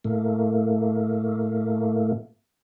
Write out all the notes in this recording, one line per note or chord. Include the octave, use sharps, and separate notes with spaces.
A2 A3 A#3